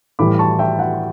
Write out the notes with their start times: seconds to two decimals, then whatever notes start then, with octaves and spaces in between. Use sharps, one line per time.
0.19 A2 E3 G3 B5 D6
0.39 A5 C#6
0.59 E5 G5
0.79 F#5